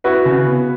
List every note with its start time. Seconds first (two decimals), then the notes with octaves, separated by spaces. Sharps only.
0.04 E4 F#4 B4
0.25 C#3
0.46 B3